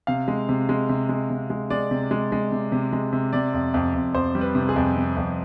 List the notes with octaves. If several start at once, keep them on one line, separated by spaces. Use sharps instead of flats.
C3 F5
G#3
C3
G#3
C3
G#3
C3
G#3
G#3 D5
C3
G#3
G#3
C3
C3
G#3
C3
C3 D5
F2
F2
F2
F2 C5
G3
B4
C3
G#4
F2
C3
F2